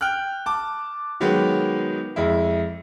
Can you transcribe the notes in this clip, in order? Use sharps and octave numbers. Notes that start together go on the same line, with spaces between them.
G5 F6 F#6
A5 D6
D#3 F#3 G#3 B3
F2 G#3 E4